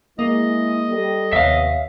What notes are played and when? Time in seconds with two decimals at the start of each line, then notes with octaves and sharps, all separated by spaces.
0.19 G#3 A#3 E4 D#5
0.89 G3 A4
1.33 D#2 C3 B3 C#5 E5 F5